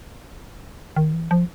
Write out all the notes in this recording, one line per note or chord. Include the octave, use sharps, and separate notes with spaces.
D#3
E3
F3